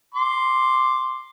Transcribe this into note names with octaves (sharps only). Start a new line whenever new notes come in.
C6 D6